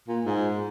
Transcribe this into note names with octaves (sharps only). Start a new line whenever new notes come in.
A#2
G#2